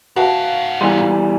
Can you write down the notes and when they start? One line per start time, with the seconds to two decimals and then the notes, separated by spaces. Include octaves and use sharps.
0.16 G#2 F#4 B4 E5 F5 A5
0.81 B2 E3 G3 C6